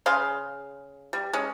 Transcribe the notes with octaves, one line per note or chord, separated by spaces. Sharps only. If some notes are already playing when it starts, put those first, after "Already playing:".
C#3 G#4 F5 C6
G3
G#3 C#4